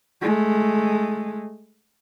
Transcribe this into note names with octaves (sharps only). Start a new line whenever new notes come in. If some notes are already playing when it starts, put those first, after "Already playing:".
G#3 A3